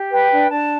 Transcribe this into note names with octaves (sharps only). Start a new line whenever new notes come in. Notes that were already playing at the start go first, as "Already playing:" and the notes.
Already playing: G4
B4 G5
D4
D4 A5